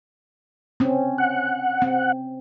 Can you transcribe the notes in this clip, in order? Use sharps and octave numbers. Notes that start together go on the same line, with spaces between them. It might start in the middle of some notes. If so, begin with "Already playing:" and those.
C4 C#4
F#5
C4